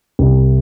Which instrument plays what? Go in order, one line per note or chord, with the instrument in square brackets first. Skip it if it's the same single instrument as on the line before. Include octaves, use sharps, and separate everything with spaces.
[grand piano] C2